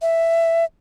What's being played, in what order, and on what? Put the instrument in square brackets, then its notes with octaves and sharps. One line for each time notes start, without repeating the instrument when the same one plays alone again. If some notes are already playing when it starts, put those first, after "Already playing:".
[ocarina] E5